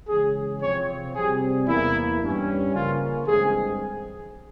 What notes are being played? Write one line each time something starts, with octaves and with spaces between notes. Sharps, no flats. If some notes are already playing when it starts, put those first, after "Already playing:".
C#3 E3 G#3 C#4 G#4
C3 F3 C4 C#5
C3 G3 C4 G#4
E2 E3 A#3 E4
G2 E3 G3 C#4
C#3 F3 A#3 C#4 F4
G2 E3 G#3 C4 G#4